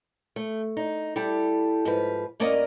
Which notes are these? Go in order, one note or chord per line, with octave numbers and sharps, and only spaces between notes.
A3
D#4
G3 E4 G4 A4
G#2 F3 B4
G2 A#3 C#4 A#4 D5 D#5